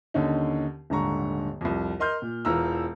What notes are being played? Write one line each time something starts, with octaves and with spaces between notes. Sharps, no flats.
D#2 D3 C#4 D#4
D#1 G#2 D3 A#5 C#6
C2 F2
A#4 D#5 C6 F6 G6
A#2
E1 E3 F4 A#5 E6